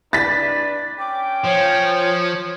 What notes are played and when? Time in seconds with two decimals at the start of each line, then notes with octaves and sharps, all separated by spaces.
0.13 D4 B4 A6 B6
0.99 C#4 G5 D6
1.45 F3 C#5